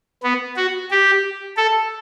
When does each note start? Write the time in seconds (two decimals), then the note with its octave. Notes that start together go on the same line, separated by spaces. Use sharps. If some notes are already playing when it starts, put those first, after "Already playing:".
0.23 B3
0.57 F#4
0.91 G4
1.57 A4